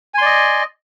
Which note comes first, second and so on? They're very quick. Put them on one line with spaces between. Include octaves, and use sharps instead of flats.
G#5 C6 D5 D#5